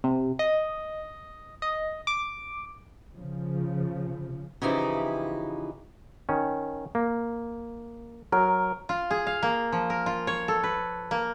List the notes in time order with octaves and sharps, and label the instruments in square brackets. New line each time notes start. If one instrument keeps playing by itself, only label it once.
[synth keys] C3
D#5
D#5
D6
[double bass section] C#3 F3
[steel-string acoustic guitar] C#3 E3 F3 D#4 E4 G4
[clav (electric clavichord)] D#3 C#4
A#3
[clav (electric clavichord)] F#3 [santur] A#4
[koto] F4
G#4
F5
A#3
F3
A#4
F4
C#5
A4
B4
A#3